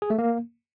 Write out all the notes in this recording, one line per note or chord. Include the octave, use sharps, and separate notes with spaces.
G#4
A3
A#3